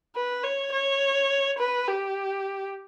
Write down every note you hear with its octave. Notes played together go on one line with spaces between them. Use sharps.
B4
C#5
C#5
B4
G4